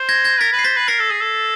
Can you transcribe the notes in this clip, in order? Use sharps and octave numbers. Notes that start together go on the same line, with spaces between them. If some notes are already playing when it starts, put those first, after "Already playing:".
Already playing: C5
G#6 A#6
G#6 A#6
A#4 A6 B6
B4
C7
C5 A6 B6
B4
A#4 A#6 C7
A4
G#4
A4